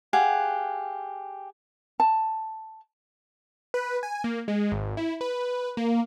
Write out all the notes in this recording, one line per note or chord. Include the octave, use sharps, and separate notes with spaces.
G4 G#4 F5 F#5
A5
B4
G#5
A#3
G#3
G#1
E4
B4
A#3